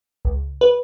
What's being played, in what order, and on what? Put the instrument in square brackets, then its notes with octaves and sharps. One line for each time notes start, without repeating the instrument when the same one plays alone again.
[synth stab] C#2
B4